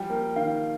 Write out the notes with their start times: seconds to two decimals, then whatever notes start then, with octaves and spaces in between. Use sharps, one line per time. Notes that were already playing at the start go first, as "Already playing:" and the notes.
Already playing: F3 G3 G5
0.10 A#3
0.36 D#3 F5